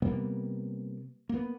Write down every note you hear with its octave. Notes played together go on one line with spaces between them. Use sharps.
C3 G3 A#3 B3
A#3 B3